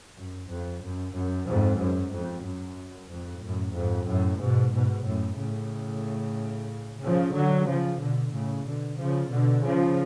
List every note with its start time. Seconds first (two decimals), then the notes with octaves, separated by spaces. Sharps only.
0.15 F#2
0.48 F2
0.82 F#2
1.14 F#2
1.47 F2 G#2
1.79 F#2
2.12 F2
2.44 F#2
3.10 F2 G#2
3.42 F#2 A2
3.75 F2 G#2
4.08 F#2 A2
4.40 G#2 B2
4.73 G#2 B2
5.06 F#2 A2
5.38 A2 C#3
7.01 C#3 F3
7.34 D3 F#3
7.67 C#3 F3
8.00 B2 D3
8.33 A2 C#3
8.65 B2 D3
8.97 C#3 F3
9.30 B2 D3
9.63 C#3 F3